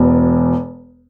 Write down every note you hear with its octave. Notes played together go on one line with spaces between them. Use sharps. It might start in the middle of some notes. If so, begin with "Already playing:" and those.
Already playing: E1 E2 B2